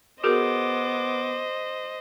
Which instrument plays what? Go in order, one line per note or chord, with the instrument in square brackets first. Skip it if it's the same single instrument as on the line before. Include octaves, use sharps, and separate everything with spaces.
[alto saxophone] B3 [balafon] F#4 G#4 A#4 [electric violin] C5 D#5 [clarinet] D6